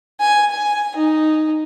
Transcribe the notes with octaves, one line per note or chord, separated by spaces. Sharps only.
G#5
G#5
D#4